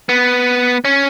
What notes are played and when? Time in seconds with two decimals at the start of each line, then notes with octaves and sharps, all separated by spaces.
0.09 B3
0.85 C#4